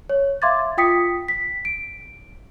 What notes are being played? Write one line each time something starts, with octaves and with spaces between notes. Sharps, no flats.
C#5
E5 F5 C6 D6 G#6 A6
F4 G5 D#6 B6 C#7
B6
D7